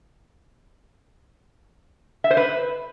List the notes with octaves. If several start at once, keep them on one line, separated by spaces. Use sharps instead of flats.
E5
C5
B4